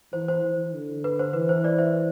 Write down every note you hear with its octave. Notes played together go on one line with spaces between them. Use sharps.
E3 C5
C5
E3
D3
B4
C5
E3 B4
C5
B4 D5
C5 E5